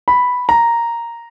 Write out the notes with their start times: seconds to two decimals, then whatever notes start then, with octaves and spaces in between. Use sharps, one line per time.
0.08 B5
0.49 A#5